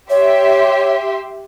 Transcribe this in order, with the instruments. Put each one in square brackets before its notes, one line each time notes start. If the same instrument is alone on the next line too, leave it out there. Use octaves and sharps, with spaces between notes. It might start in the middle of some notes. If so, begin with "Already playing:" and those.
[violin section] G4 E5 C6 [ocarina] C#5